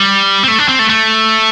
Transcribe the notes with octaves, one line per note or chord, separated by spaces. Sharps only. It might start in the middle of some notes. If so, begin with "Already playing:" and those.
Already playing: G3
C4
A3
D4
C4
A3
A3